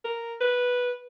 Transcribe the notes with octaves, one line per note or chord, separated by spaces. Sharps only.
A#4
B4